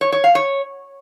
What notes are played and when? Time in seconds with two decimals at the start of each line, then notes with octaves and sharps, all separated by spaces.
0.01 C#5
0.12 C#5
0.24 F5
0.35 C#5